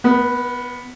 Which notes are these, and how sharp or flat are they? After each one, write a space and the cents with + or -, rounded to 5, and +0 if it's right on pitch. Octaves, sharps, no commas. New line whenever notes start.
B3 +0 A#4 +45